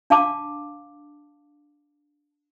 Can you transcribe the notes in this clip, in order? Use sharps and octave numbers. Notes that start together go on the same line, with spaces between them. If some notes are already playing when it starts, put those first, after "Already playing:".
D4 F5 A5 D6